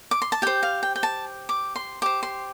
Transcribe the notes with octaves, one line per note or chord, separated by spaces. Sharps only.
D6
C6
A5
G4 C5 G5
F5
G5
G5
A5
D6
C6
G4 C5 D6
C6